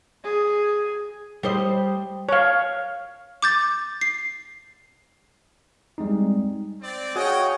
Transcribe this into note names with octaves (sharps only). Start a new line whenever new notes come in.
G#4
G3 C5 D#5
C#5 F5
D6 G6 A6
C7
G3 G#3 C4 D#4
C4 D5
F#4 G#4 C#5 D#5 F5 G5